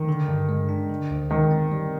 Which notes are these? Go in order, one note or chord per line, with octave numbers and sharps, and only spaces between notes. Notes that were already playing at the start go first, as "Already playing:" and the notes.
Already playing: D#3
D3
G2
G#3
D4
D3
D2
D#3 G#3
C4
G3